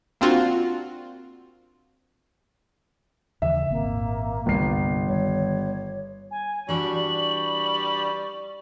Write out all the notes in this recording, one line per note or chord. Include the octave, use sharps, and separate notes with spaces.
A#3 C4 D4 F4 F#4
D#2 C#3 E3 E5
G#1 A#2 A#3 C4
G1 C2 C7
D#3 G3 C#5
G#5
E3 G3 D4 F#4 C#6 F#7